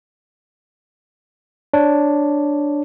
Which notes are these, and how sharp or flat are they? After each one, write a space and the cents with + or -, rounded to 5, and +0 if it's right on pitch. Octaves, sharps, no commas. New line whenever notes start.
D4 +0 C#5 +0